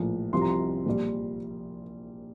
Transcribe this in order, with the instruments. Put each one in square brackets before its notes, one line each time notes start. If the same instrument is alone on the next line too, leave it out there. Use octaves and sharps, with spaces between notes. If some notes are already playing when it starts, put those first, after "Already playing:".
Already playing: [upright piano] A#1 A2 F3
C2 C3 F3 C6
A#5
C6
A#1 A#2 G3